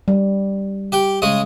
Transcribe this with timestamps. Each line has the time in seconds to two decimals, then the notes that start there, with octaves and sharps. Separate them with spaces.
0.08 G3
0.92 G4 G5
1.22 C#3 G#3 D#6